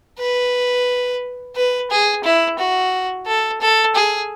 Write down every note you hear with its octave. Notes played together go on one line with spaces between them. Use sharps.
B4
B4
G#4
E4
F#4
A4
A4
G#4